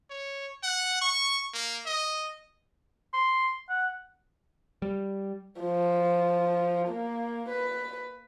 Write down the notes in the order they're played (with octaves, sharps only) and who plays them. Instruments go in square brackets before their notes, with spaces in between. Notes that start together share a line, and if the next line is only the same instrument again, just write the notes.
[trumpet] C#5
F#5
C#6
A#3
D#5
[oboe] C6
F#5
[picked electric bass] G3
[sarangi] F3
A#3
B4